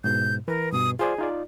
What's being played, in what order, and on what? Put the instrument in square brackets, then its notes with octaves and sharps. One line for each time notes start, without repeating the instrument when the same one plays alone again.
[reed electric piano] G#2 B2 [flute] G6
[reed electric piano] E3 B4 [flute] A#4
[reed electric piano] G2 B2 [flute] D#6
[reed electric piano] F4 C5 D5 [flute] G#4
[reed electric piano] D#4 F4 D5